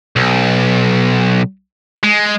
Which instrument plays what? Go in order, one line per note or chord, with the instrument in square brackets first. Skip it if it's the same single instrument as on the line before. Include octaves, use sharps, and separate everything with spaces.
[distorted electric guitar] B1
G#3